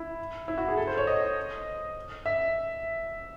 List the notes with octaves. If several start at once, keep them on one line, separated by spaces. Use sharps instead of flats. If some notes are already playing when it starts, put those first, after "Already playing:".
Already playing: E4
E4
F#4
G#4
A4
C5
C#5
D#5
E5